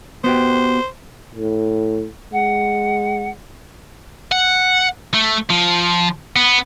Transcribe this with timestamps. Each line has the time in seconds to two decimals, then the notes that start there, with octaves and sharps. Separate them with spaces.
0.24 B3 F#4 G4 C5
1.35 A2
2.33 G#3 F#5
4.32 F#5
5.14 A3
5.50 F3
6.36 B3